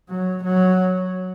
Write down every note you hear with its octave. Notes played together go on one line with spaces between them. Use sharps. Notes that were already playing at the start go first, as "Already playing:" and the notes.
F#3
F#3